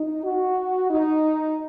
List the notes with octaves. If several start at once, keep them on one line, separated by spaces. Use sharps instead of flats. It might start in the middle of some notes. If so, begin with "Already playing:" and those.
Already playing: D#4
F#4
D#4